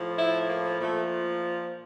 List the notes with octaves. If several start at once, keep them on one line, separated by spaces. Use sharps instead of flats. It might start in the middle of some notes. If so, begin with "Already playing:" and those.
Already playing: A2 F3
E4
A#3
A#2 F3 A3